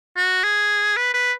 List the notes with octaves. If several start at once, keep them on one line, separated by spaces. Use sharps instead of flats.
F#4
G#4
B4
B4